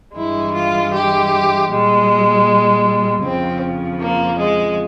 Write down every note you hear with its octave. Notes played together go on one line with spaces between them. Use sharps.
G2 E3 G#3 E4
F4
G4
A#2 G3 G#3
F2 C#3 F3 C4
A#3
G#3